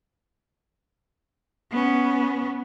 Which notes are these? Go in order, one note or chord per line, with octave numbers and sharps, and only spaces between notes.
B3 C#4